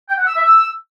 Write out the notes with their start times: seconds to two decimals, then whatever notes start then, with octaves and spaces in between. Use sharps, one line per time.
0.09 G5
0.18 F#5
0.27 E6
0.36 E5
0.45 E6